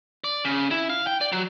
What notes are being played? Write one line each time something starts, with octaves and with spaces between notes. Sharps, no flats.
D5
C#3
E4
F5
G5
D5
F#3